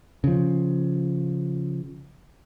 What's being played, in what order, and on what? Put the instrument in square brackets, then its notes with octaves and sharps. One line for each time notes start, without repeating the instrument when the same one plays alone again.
[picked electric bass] C#3 F3